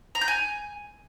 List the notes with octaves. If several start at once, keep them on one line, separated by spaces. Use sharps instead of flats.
A#5
G6
G#5